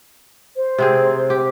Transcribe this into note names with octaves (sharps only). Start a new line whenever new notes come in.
C5
C3 C4 G#4
G4